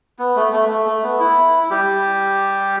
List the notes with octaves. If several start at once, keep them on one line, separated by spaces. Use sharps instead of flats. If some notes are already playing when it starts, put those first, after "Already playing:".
B3
A3
A3
A3
A3
B3
E4
E4
G3 G4